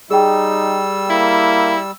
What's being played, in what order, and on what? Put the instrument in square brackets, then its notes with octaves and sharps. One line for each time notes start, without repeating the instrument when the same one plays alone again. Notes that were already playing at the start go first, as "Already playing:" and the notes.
[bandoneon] G3 E6 [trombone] D#4 [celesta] G#4 G5
[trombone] A#3 [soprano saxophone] E4